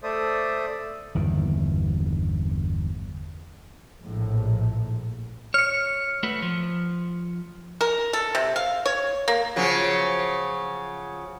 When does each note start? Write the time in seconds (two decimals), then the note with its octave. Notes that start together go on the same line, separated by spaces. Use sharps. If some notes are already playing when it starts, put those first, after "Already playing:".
0.03 A3 A4 C5 D5 E5 D#6
1.15 G1 E2 D#3
4.01 A#1 A2
5.54 C#5 F6 C#7
6.23 A3 F#4 B4
6.42 F3
7.81 A#4
8.13 A4
8.35 C3
8.56 F5
8.86 C#5
9.28 A#3
9.56 C#3 F3 F#3